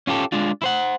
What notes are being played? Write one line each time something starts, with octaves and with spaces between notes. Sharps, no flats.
C#4 F4 G4 A4
G#3 D4 F4
E4 C5 F#5